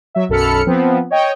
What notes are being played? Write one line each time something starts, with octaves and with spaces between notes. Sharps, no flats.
F#3 E5
B1 F#2 A4 B5 F6 C#7
F3 B3 C4
C#5 D#5 G5